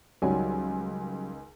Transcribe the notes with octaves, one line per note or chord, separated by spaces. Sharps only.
C#2 D#3 F#3 G3 G#5